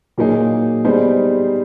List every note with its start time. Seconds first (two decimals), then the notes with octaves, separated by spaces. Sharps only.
0.18 A#2 F#3 A#3 D#4 G#4
0.85 G3 B3 D#4 G#4 C5